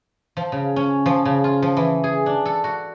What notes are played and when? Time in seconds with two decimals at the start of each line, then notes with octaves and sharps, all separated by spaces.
0.37 F3
0.52 C#3
0.76 C#4
1.06 F3
1.25 C#3
1.44 F4
1.62 F3
1.77 E3
2.04 G#4
2.26 D4
2.46 A4
2.64 F#4